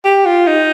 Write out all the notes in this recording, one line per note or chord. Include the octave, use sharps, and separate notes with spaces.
G4
F4
D#4